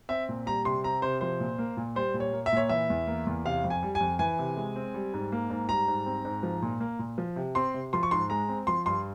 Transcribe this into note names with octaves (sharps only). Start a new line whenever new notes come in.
C4 E5
A#2
G3 A#5
C3 C6
C4 A#5
C3 C5
F3 C5
A#2
A#3
A#2
G3 C5
A#2
C#5
A#3
E5
A#2 C#5
E3 E5
E2
A#3
E2
C3 F5
F2
G#5
G3
G#5
F2
E3 G#5
C3
G#3
C4
G3
G#2
A#3
G#2
G3 A#5
G#2
C4
G#2
F3
A#2
A#3
A#2
F3
C3
C4 C6
C3
F3 C6
C#6
G#2 C6
G#3 A#5
C4
F3 C6
G2 C6